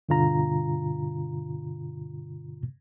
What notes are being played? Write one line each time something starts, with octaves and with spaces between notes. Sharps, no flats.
G2 B2 D3 F4 A#5